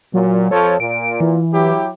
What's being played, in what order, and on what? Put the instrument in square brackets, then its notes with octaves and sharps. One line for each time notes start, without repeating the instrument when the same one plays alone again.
[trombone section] A#2 [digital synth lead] F#3
[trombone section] F2 F3 A4 [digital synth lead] C#5
[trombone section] A#2 [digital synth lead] D7
[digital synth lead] E3
[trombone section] F#3 E4 G4